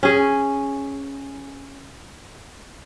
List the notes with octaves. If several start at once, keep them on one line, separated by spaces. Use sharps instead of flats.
C#4 G#4